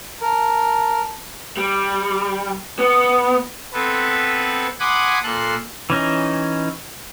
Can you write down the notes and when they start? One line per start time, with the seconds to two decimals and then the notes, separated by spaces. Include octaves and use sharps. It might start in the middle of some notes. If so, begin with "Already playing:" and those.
0.22 A#4 A5
1.57 G3
2.79 B3
3.73 B3 C4 A4 B4
4.80 F#5 G#5 B5 C6 D6 D#6
5.23 A#2 A4 C6 F#6
5.90 E3 C#4 D#4